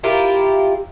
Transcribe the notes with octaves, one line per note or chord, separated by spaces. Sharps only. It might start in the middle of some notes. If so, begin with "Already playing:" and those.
E4 F4 G4 A#4